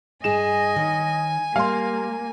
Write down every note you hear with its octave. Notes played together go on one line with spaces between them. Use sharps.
G2 G#4 D#5 G#5 E7
D#3 C#5
G3 A#3 F5 C6